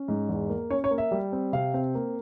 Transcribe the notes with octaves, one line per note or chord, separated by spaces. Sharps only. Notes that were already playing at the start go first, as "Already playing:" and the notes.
Already playing: C#4
G#2
E2
A#3
C#4 C#5
C#5
A#3
E5
G3
C4
C3 F5
C4
A#3